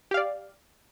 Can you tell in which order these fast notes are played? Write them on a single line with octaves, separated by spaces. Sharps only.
G4 F5 D5